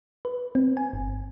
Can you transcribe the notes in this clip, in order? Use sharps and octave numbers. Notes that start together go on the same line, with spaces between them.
B4
C4
G#5
G1